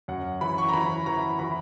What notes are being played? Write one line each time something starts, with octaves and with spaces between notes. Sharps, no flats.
F#2 F#5
E3 B5
C#6
A#5
E3 B5
E3 A#5
E3 B5